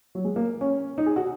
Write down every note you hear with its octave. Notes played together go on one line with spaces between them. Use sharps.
F#3
G#3
A#3
C#4
D#4
G#4
F#4